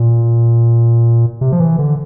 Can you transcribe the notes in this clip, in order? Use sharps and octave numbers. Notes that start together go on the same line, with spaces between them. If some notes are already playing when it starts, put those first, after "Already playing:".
Already playing: A#2
C3
F3
E3
D3